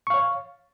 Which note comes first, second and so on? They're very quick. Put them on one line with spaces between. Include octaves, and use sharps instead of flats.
C#6 F5 C#5